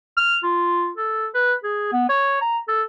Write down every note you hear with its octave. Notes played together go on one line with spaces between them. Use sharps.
F6
F4
A4
B4
G#4
B3
C#5
A#5
A4